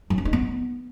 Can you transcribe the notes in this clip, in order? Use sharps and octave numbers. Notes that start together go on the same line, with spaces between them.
F#3
D4
D#4
B3